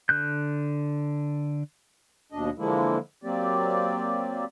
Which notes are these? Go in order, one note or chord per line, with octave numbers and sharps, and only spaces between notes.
D3 F#6 G6
D#2 B2 D4 D#5
D3 E3 F3 G#3 A#3 E4
F#3 A#3 C4 G4 D5